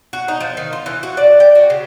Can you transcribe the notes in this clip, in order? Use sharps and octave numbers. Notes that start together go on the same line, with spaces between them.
F#4
D#4
F3
D#3
F4
E3
F#4
D5
G5
F#4
C#3